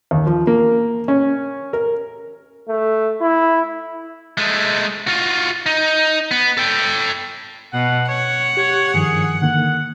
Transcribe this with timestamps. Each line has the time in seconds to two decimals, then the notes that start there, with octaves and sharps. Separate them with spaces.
0.11 D#2
0.27 F3
0.47 A#3
1.08 C#4
1.73 A#4
2.68 A3
3.21 E4
4.38 G#3 A3
5.07 F4 F#4
5.66 D#4
6.31 B3
6.57 A4 G5
7.73 B2 F#5
8.08 C#5 F#5
8.57 G4 C#5
8.94 G2 D#3 F3 G#4
9.42 D3 D#3 A#3 F#5